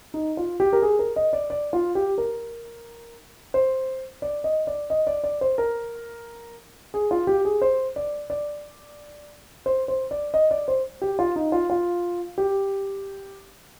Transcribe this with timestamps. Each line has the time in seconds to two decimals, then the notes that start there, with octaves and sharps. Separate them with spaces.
0.14 D#4
0.37 F4
0.60 G4
0.73 A#4
0.82 G#4
0.99 A#4
1.16 D#5
1.33 D5
1.50 D5
1.73 F4
1.95 G4
2.18 A#4
3.54 C5
4.22 D5
4.44 D#5
4.67 D5
4.90 D#5
5.07 D5
5.24 D5
5.41 C5
5.58 A#4
6.94 G#4
7.11 F4
7.27 G4
7.45 G#4
7.62 C5
7.96 D5
8.30 D5
9.66 C5
9.88 C5
10.11 D5
10.34 D#5
10.51 D5
10.68 C5
11.02 G4
11.19 F4
11.36 D#4
11.52 F4
11.70 F4
12.38 G4